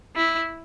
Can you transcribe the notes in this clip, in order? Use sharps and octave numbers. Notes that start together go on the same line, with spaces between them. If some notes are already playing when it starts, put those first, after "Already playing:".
E4